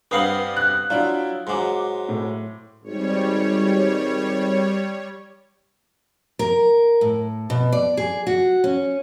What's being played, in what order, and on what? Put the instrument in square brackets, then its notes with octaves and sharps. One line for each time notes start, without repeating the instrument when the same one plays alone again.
[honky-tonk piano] G2 B4 [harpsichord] C4 F5 F#5 [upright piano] D#6 C7 F#7
[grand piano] F#6
[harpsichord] F#3 [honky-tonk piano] D4 E4 [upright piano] F4
[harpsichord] G#2 F#3 [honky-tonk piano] C6 D6
[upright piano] A2
[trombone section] G#1 [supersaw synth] G3 C#5
[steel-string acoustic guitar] A#4
A2
B2
D5
G#4
F#4
C#4